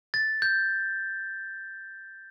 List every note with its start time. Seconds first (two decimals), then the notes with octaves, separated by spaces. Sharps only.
0.14 A6
0.42 G6